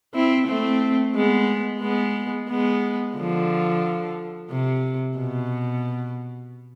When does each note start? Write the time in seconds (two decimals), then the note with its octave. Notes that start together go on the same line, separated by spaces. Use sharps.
0.14 C4 E4
0.48 A3 C4
1.15 G#3 B3
1.82 G#3 B3
2.50 G#3 B3
3.17 D3 F3
4.50 C3
5.17 B2